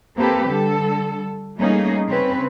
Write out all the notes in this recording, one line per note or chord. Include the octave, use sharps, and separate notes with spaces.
A#3 C4 G4 A4 B4
D3 G3 A4
G3 A3 A#3 C#4 D#4 G#4
C#3 C4 C#4 B4